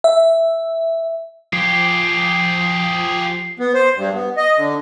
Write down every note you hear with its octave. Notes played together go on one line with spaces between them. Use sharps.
E5
F3 G4 G#4 C7
B3
C5
G2
B3
D#5
D3